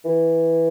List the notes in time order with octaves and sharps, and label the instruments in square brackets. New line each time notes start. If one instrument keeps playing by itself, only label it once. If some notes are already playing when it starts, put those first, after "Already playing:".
[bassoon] E3